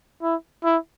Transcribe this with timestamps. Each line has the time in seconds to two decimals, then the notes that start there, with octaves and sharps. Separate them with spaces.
0.23 E4
0.64 E4